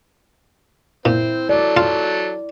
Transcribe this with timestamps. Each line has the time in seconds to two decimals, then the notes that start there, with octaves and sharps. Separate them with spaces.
1.05 A#2 C4 E4
1.49 F#3 A4 D5
1.77 F4